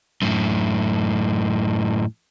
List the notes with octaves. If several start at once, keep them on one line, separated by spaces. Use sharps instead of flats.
F#2 A2